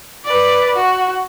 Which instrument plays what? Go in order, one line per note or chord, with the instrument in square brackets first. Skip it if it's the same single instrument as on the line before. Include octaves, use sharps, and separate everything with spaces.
[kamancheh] B4 D5
F#4